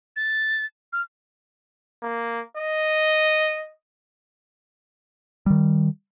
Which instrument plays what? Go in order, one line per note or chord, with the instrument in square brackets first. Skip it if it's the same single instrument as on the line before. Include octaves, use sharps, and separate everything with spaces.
[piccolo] A6
F6
[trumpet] A#3
D#5
[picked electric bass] D#3 G3